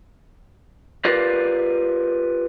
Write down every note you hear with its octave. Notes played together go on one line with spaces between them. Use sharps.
F4 G4 A#4 B4 D5 F5